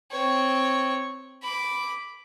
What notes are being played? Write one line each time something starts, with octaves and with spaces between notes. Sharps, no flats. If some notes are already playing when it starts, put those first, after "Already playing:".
C4 C#5
B5 D6